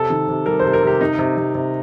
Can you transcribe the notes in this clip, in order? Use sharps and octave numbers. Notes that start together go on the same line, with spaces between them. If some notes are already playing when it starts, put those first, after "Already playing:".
Already playing: C3 A4
D#3
C3
G3 A#4
C5
C3
A#4
C3 G4
C3 D#4
C3
C3
C3